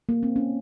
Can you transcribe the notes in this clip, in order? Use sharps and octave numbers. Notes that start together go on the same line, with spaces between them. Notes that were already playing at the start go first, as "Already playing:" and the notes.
A#3
C4
C#4